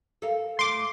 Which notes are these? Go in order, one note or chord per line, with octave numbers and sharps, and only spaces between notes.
A4 A#4 F5
A3 F4 C6 D6